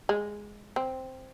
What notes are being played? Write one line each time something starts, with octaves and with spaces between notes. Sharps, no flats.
G#3
C4